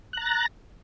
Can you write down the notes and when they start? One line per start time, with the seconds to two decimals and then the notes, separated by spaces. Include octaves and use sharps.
0.13 F#6
0.17 A#5
0.22 A6
0.26 A#6